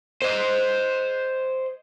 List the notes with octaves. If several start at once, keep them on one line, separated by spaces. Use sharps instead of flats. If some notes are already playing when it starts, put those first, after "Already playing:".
C5 D#5